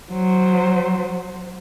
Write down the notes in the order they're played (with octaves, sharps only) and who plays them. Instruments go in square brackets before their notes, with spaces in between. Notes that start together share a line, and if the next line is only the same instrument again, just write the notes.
[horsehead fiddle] F#3 C5